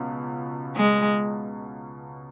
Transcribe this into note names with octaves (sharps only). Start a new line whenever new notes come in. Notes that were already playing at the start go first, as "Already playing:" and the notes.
Already playing: C#2 B2
G#3